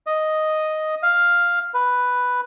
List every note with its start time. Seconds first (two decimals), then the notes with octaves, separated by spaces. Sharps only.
0.06 D#5
1.03 F5
1.74 B4